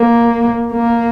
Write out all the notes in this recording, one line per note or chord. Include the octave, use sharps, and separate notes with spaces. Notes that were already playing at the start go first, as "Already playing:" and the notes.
Already playing: A#3
A#3